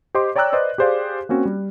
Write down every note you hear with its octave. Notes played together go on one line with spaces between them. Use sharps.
G4 C5 D#5 C6 D6
C#5 D5 G5 A#5 E6 F#6
B4 C5 D5 D#5
G4 G#4 C5 D5 F5
A#3 C4 C#4 F#4
G3